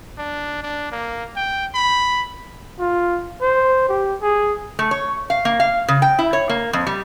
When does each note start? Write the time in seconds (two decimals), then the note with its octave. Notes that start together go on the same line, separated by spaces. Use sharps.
0.18 D4
0.63 D4
0.92 A#3
1.36 G5
1.74 B5
2.80 F4
3.42 C5
3.89 G4
4.22 G#4
4.79 A3
4.91 C#5
5.30 F5
5.45 A#3
5.60 F5
5.88 C#3
6.02 G5
6.19 E4
6.33 C#5
6.49 A#3
6.73 F2
6.87 G3